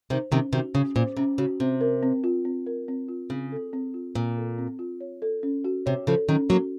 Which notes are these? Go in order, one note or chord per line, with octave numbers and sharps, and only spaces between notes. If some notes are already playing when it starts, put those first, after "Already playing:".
C3 D#3 C5
C3 D#3 C#4
C3 D#3 F#4
C#3 C#4
A#2 C5
C3 C#4
C#3 F#4
C3 C4
A#4
C4
F4
C4
A#4
C4
F4
C#3 C4
A4
C4
F4
A#2 C4
A4
C4
F4
C#5
A4
C#4
F#4
C3 C#5
C#3 F3 A4
D#3 F#3 C#4
F#3 A#3 F#4